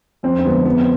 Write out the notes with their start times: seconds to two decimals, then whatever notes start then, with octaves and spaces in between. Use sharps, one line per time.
0.23 F2 C4
0.39 C4
0.45 D3 F3 G#3 B3
0.65 F2 B3
0.80 C4